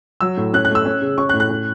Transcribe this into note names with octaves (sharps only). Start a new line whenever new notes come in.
F#3 E6
A2
C#4 F#6
F#6
A3 E6
C#4
C#3
C#4 C#6
F#6
A2
F#6
C#4